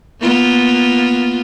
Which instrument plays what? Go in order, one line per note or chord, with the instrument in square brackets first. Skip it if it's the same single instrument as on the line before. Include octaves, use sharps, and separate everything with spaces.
[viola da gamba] A#3 B3 F4